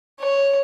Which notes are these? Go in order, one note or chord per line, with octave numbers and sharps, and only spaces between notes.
C#5